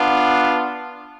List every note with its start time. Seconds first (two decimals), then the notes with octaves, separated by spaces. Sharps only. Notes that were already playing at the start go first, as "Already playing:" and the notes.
Already playing: B3 D4 F4